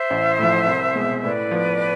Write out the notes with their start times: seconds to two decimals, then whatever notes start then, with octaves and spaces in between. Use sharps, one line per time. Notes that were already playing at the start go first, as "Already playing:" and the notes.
Already playing: C5 E5
0.10 A1
0.39 A2 F3
0.66 C2
0.95 B2 G#3
1.23 A2 B4 D5
1.51 F3 B3